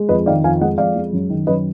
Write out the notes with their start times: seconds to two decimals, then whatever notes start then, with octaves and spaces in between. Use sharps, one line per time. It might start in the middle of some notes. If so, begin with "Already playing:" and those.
Already playing: G#3
0.09 F2 B4 D#5
0.26 D#3 D5 F5
0.44 F2 F5 G#5
0.61 G#3 D#5 F#5
0.78 F2 D5 F5
0.96 G#3
1.13 F#2
1.30 D#3
1.47 F#2 B4 D#5